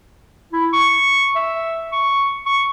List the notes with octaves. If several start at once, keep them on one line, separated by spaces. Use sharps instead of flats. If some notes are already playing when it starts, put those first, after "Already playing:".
E4
C#6
E5
C#6
C#6